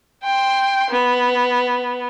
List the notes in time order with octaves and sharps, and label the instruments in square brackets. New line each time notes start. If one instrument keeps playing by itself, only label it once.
[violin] G5 C6
B3